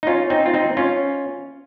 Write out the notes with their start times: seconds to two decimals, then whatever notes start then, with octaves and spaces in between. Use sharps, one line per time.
0.03 D#4
0.07 C#4 F4
0.30 C4 D#4
0.46 F4
0.54 C4 D#4
0.77 C#4 F4